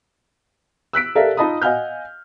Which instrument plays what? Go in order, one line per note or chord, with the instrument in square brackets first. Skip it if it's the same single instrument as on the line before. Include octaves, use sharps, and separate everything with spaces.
[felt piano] E6 F#6 B6 D7
G4 A4 A#4 D5 E5 F5
D#4 F4 D#5 A5 B5 D#6
D#5 F5 F#5 G#5 F6 G6